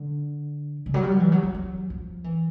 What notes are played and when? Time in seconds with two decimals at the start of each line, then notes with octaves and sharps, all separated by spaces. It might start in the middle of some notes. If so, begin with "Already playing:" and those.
Already playing: D3
0.86 C#3
0.94 F#3
1.03 G3
1.12 F#3
1.20 E3
1.32 F#3
1.43 F#3
1.54 F#3
1.90 F3
2.24 E3